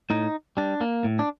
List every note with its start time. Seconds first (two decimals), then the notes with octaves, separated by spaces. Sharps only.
0.10 A2 D#4
0.57 G3 D4
0.81 A#3
1.04 A2
1.19 D4